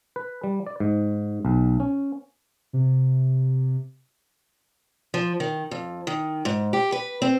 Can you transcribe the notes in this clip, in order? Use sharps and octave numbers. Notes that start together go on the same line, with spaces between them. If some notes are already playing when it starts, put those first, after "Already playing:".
B4
G3
D5
G#2
B1
C#4
C3
F3
D#3
F2
D#3
G#2
G4
B4
C4